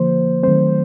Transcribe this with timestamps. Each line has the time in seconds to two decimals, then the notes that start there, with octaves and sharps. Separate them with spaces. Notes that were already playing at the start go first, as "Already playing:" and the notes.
Already playing: D3 F3 A#3 C5
0.43 D#3 F#3 A3 C4 C5